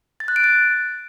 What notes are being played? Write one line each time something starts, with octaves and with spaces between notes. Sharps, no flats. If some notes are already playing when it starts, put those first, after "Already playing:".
A6
F#6
D7
A6